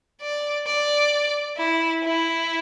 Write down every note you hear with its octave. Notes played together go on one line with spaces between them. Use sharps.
D5
D5
E4
E4